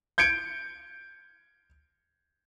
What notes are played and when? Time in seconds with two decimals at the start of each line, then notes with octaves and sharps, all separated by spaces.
0.18 G6 G#6 C#7 D7